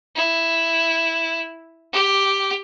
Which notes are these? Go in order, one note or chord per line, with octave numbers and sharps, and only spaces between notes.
E4
G4